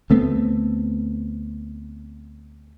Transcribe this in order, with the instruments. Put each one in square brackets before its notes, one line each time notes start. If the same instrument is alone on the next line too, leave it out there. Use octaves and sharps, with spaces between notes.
[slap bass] D2 A3 B3 C4